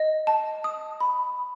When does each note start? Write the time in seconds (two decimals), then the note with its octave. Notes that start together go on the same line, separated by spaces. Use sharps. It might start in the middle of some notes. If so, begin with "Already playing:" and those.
Already playing: D#5
0.27 A5
0.64 D#6
1.00 B5